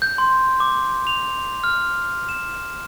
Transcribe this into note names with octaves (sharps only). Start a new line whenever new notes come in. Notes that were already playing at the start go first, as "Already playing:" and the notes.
G6
C6
D6
F7
F6
E7